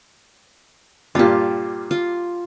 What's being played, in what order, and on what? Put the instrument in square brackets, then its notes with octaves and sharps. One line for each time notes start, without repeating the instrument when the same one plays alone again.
[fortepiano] G2 A#2 [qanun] F4 G4
[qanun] F4